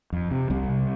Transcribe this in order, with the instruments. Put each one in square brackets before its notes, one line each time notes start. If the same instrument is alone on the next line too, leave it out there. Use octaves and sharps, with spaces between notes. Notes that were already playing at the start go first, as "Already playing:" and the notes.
[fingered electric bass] F2
C3
C2 G3 C4
C3